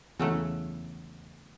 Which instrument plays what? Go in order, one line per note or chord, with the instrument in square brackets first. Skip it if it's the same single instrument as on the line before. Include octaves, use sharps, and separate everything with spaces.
[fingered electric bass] E2 [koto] C#3 F#3 A3